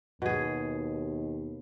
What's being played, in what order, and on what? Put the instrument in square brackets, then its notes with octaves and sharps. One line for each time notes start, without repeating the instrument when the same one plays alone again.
[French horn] D#2 [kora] B2 G#4